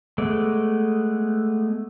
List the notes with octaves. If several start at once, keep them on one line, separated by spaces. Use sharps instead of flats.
G#3 A3 B3 D5